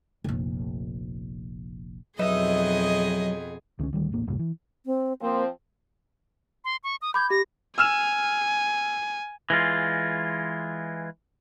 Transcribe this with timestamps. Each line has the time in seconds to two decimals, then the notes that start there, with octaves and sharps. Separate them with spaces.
0.24 F1 A#1
2.19 F2 B2 F#3 D#4 G#4 B4 D#5 E5
3.79 C#2 D3 G#3 C#4
3.93 D2 D#3 G3
4.12 D#1 A1 A#3
4.27 F1 C#2 G2 A#2
4.39 E3
4.86 C4
5.21 F3 A#3 C4
6.65 C6
6.84 C#6
7.02 D#6
7.14 B5 D6 G6 G#6
7.30 G4 A#6
7.78 G#5 E6 F6 E7
9.50 E3 G#3 F4